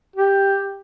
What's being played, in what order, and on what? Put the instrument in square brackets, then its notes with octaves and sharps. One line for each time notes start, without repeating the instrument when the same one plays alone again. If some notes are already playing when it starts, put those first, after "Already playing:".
[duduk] G4